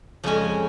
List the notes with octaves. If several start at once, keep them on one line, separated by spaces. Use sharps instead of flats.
F2 C#3 G#3 C#4